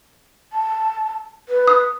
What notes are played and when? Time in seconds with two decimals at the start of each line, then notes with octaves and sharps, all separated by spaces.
0.52 A5
1.49 B4
1.67 D#6